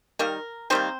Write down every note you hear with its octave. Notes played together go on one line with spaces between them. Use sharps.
D#3 G3 A#3 A#4
D#3 G3 A#3 C4 C5